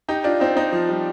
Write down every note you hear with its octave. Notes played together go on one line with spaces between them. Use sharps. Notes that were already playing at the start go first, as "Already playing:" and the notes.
D#4 G4
D4 F4
C4 D#4
C4 D#4
F3
G3